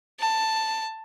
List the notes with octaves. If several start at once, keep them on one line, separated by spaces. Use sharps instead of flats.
A5